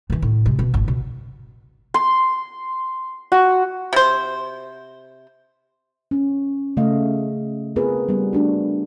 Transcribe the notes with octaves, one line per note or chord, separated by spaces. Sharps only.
B2 E3
A2
C3 G#3
B2
G#1 F4
B2
C6
F#4
C3 C5
C#4
C#3 A3 D#5 F5
B3 C4 F4 G#4 A#4 B4
G3 B3
A3 D4 F#4